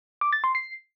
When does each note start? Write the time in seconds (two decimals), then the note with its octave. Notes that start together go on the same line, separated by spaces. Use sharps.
0.21 D6
0.33 A6
0.44 C6
0.55 C7